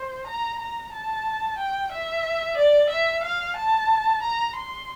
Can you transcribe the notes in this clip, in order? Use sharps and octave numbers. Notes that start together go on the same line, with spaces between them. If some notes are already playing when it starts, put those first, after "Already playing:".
Already playing: C5
A#5
A#5
A5
G5
E5
D5
E5
F5
A5
A#5
C6